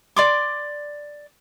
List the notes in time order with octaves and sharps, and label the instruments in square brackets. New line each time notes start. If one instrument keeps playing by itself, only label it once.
[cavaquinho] D5 C6 D6